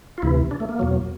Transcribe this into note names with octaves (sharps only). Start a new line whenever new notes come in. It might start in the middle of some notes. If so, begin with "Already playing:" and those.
F4
D2 C3 E3 E4
D4
A3
A#3
E2 B2 F#3